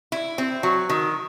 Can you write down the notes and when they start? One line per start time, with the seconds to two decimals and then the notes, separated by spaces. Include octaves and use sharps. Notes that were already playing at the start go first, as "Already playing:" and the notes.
0.12 E4
0.38 C4
0.63 F#3
0.89 D#3